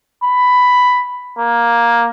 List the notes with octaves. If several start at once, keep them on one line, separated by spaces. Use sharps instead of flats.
B5
A#3